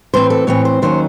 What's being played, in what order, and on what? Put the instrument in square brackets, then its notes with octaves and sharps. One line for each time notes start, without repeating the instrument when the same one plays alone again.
[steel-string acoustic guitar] A2 E3 C4 C5
A4
A2 E3 C4 C#5
C5
D#2 D#3 F#3 C#4 C5